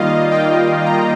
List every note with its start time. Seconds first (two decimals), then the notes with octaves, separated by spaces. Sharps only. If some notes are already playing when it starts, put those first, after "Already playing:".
Already playing: D#3 G3 A#3 F4 D#5 F5
0.31 G5
0.85 A#5